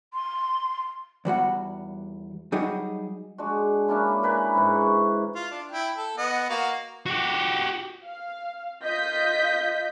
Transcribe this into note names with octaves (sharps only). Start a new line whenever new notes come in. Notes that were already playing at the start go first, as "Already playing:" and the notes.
C6
E2 G3 F#4 F#5
F#3 G3 D#4 F#4 G#4
G#3 D4 F#4
A#3 C#4 D4 E4
A#4 B4 G#5 B5
G#2 E3
C#6
F4
D4
E4 G5
A4
B3 D#5 F#5
A#3 F#4 F5
F#4 G4
F5
F4 D#5 G6 B6